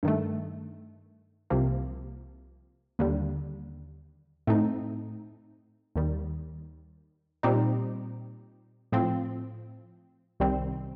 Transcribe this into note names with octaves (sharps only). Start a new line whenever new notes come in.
G2 D#3 A3
C2 C3 F3 A#3
D#2 D3 G3
A2 A3 C4 D#4
D#2 D#3 G3
A#2 G3 C4 D#4 G4
A2 F3 C4
C2 C3 D#3 G3 C4